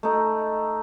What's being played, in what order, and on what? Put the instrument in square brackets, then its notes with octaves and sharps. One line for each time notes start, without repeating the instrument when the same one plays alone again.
[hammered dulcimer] A3 D#4